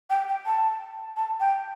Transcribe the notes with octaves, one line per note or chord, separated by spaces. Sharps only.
G5
G5
A5
A5
G5